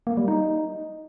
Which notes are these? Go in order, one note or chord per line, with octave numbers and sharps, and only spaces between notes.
A#3
G3
D#4